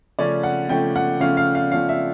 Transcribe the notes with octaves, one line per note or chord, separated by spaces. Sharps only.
C#3 F3 A3 C#4 D5
F#5
C#3 F3 A3 C#4 G5
F#5
C#3 F3 A3 C#4 F5
F5
F5
C#3 F3 A3 C#4 F5
E5